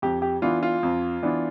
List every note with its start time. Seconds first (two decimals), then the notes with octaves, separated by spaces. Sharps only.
0.02 F2 G4
0.22 G4
0.42 E3 B3 D4 F4
0.63 F4
0.83 F2
1.23 E3 B3 D4